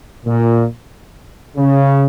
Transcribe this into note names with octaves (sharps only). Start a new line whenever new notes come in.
A#2
C#3